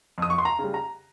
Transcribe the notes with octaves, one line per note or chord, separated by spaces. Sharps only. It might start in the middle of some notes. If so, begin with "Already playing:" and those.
F2 D#6
C#6
C6
A#5
C#3
G3
A#5